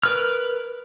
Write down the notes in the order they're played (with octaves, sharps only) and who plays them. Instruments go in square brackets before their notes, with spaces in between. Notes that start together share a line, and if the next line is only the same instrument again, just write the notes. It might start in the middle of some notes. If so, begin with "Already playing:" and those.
[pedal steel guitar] A#4 B4 F6